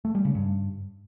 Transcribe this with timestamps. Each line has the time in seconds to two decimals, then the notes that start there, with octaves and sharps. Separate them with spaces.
0.05 A3
0.15 G3
0.25 C#3
0.35 G2